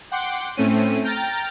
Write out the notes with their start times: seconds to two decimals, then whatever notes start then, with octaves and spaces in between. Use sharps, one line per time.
0.11 F#5 G5 C6 D6 G6
0.57 A2 A3 C4 C#4 D#7
1.04 G5 A#5 F6 A6